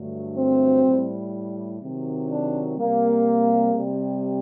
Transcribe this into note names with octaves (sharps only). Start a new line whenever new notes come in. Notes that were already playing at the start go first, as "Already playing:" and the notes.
Already playing: G2 D3 F#3 A3
C4
A2 G3
C3 D#3 F#3
D4
C3 G3 A#3
C3 G3